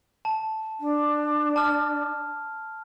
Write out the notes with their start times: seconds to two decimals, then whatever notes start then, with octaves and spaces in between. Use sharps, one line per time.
0.25 A5
0.80 D4
1.56 A5 F6